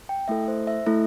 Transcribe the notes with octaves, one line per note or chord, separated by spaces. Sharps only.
G5
A3 E4 A4 E5
C5
E5
A3 E4 A4